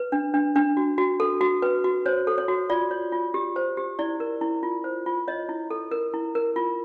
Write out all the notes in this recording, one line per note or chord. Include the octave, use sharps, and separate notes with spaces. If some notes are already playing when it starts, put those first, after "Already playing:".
Already playing: B4
D4
D4
D4
F#4
F#4
A4
F#4
B4
F#4
C5 C#5
A4
C#5
F#4
F4 D5
C#5
F4
G4
C5
G4
E4 D5
A#4
E4
F4
C5
F4
C#5 D#5
E4
A4
A#4
E4
A#4
F4